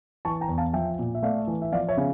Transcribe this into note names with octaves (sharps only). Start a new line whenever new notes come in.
E3 A5 C#6
G5 A#5
E2
F5 A5
F3 E5 G5
A#2
E5
A3 D5 F5
E3
E5
F3 D5 F5
C#5 E5
C#3